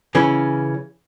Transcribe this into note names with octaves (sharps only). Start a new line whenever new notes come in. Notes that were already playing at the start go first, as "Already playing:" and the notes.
C#3 E3 C#4